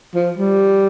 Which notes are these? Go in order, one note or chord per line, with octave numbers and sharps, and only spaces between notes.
F3
G3